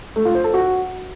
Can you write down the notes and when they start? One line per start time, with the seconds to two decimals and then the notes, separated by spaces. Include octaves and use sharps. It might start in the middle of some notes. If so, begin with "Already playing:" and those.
0.16 A3
0.25 F4
0.35 C5
0.44 A4
0.54 F#4